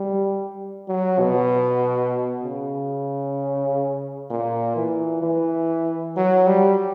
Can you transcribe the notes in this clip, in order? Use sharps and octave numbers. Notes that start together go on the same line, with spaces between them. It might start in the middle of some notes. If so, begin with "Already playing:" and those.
Already playing: G3
F#3
B2
C#3
A#2
E3
E3
F#3
G3